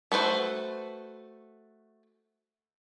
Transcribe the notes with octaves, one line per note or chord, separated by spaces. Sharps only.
A3 F#4 B4 C5